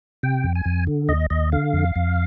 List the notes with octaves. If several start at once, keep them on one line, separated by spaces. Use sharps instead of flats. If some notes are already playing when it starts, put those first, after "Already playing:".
C3 G5
F2
G#5
F2
D3
D#2 D#5
D#2 D#5
D3 F5
F2
F2